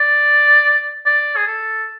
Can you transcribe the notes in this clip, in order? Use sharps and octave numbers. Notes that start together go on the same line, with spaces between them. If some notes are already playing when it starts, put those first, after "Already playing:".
Already playing: D5
D5
G#4
A4